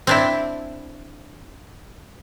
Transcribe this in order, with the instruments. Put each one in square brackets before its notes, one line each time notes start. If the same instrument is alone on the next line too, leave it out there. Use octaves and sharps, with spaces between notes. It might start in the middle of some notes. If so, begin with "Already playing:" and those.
[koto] C4 D4 E4